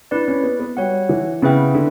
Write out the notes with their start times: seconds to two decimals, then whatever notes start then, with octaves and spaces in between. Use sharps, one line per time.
0.11 D4 E4 B4 D5
0.28 C#4
0.43 B3
0.60 B3
0.77 G3 F#4 C#5 F#5
1.09 E3
1.42 C#3 B3 E4 B4 E5 G5
1.75 D3